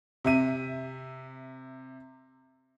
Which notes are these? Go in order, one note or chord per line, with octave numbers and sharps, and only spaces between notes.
C3 E5 D#7